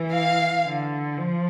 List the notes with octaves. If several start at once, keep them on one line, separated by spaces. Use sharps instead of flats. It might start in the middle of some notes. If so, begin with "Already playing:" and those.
Already playing: E3
F5
D3
F3